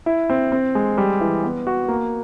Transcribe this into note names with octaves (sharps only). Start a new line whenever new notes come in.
E4
C4
C4
G#3
G3
E3
B3
F#4
A#3